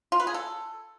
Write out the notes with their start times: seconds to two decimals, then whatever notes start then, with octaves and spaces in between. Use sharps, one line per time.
0.12 F4
0.19 B4
0.27 G#4
0.34 A4